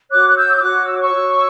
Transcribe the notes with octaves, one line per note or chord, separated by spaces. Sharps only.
F#4 C#5 D6 F#6
F#6
E6 G6
E6
F#4 C#5 D6 F#6
E6
D6
C#6 E6
F#4 C#5